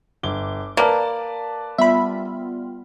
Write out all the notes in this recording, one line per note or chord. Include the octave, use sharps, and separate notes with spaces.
G1 D6 G7
A#3 B4 D5 A5
G3 B3 F4 E5 B5